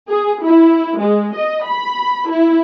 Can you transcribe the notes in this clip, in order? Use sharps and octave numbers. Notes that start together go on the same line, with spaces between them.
G#4
E4
G#3
D#5
B5
E4